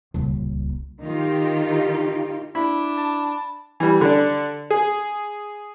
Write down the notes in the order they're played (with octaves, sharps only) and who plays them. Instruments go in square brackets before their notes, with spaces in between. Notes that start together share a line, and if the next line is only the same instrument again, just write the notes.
[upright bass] D#1 C#2
[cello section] D#3 D#4 F4 G4
[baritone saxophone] D4 [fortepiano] E4 [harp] B5
[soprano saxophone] A5
[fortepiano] E3 G3
D3 D4
G#4